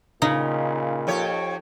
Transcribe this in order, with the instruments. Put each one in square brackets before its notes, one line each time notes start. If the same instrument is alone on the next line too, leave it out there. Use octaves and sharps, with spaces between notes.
[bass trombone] A#2 [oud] C#3 [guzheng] D#4
[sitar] F2 G4 C#5